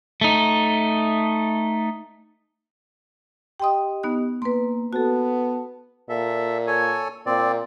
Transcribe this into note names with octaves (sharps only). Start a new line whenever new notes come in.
A3 D#4
G4 D#5 G5 C6 D#6
B3 D#4 F#6
A#3 B4 C6
B3 F#4 A4 A5
A#2 A4 E5
A4 C#5 G#5
A#2 C4 D5